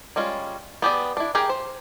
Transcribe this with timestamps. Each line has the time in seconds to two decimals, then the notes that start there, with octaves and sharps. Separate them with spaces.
0.16 G3 G#3 C#4 F4
0.82 B3 G4 G#4 D5
1.17 D4 E4
1.35 G4 G#4 A#4 G5 A#5
1.49 C5